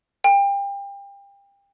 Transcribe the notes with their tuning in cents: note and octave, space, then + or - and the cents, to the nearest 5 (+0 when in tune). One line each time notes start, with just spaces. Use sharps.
G5 +30